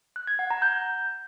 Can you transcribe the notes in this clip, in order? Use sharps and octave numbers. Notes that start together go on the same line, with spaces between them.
F#6
G#6
F#5
A#5
G6